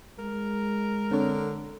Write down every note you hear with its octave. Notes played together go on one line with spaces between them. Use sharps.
G#3 A#4
D3 C4 D4 C#5